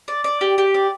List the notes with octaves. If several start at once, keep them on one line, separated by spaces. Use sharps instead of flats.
D5
D5
G4
G4
D5